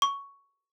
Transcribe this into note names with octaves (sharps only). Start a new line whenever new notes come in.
C#6